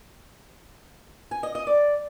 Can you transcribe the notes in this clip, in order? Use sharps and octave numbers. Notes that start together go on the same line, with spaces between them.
G#5
D#5
D#5
D5